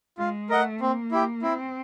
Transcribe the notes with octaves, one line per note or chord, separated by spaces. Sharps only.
G#3 F4
A3 A#4 D#5 F#5
A#3 C4
E4 G4
C4 E4